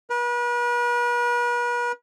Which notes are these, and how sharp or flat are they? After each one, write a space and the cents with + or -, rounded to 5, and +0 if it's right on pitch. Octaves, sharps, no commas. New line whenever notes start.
B4 -40